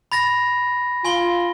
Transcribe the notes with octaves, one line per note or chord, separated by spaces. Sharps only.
B5 A6 A#6
F4 G#5 C6 G7